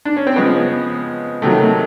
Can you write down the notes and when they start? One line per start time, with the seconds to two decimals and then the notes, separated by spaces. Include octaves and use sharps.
0.05 D4
0.17 C#4
0.27 C4
0.36 C#3 F3 G#3 B3
1.42 C3 D#3 F#3 A3
1.60 A3